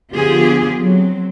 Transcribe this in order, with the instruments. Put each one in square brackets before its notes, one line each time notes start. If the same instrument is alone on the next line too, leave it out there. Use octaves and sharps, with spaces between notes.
[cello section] D3 F3 B3 F4 G4 G#4
F#3 C4